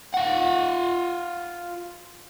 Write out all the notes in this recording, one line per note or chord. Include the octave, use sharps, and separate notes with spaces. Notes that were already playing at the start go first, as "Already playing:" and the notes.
F4 F#5